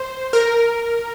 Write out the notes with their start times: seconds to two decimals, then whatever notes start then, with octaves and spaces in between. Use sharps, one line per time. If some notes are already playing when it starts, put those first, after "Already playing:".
Already playing: C5
0.33 A#4